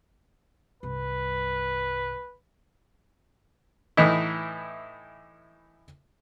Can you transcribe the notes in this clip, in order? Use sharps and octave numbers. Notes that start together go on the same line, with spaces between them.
C2 G2 B4
A2 E3 D#4 E4